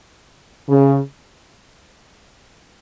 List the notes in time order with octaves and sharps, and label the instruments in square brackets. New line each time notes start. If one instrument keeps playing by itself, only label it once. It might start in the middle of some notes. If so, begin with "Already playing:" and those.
[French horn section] C#3